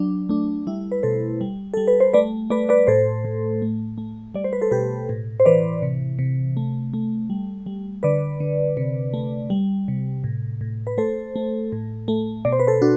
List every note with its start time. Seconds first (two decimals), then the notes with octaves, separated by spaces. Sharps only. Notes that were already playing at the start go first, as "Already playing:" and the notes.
Already playing: F#3 D4
0.29 A3 D4
0.67 G3 E4
0.92 B4
1.03 B2 A4 C5
1.41 G3
1.74 G3 A4
1.88 B4
2.00 C5
2.13 A3 B4 D5
2.50 A3 B4 D5
2.69 B4 D5
2.87 A2 A4 C5
3.25 A2
3.62 A3
3.98 A3
4.34 G3 D5
4.44 C5
4.53 B4
4.61 A4 C5
4.71 B2 G4 B4
5.09 A2
5.40 C5
5.45 E3 B4 D5
5.82 C3
6.19 C3
6.57 A3
6.94 A3
7.30 G3
7.66 G3
8.03 D3 B4 D5
8.40 D3
8.77 C3
9.14 A3
9.50 G3
9.88 C3
10.24 A2
10.61 A2
10.87 B4
10.98 A3 A4 C5
11.36 A3
11.72 A2
12.08 A3
12.45 B2 D5
12.52 C5
12.60 B4
12.67 A4 C5
12.82 D4 F#4